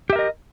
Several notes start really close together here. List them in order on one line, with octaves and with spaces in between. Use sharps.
G4 E5 A#4 D#5